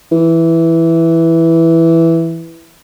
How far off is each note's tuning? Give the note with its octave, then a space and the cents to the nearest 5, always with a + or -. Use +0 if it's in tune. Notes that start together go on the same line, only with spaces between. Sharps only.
E3 +0